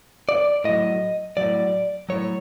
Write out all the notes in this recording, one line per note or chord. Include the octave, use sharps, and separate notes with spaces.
D5
A2 F#3 D#5
A2 F#3 D5
A2 F#3 C#5